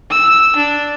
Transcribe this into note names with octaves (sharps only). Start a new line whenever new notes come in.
E6
D4